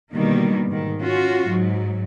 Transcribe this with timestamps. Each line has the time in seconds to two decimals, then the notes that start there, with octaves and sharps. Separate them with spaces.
0.13 B2 D3 D#3 G3 A#3
0.68 G#2 D#3
1.02 C#4 F4 F#4
1.47 G#2 F#3